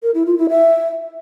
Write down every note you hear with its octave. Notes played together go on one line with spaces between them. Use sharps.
A#4
E4
F4
E4
E5